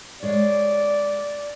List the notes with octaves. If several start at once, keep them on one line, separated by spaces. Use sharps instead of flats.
G#3 C#5 D5